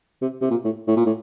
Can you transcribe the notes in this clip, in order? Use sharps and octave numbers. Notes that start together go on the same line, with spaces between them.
C3
C3
A#2
A2
A2
A#2
A2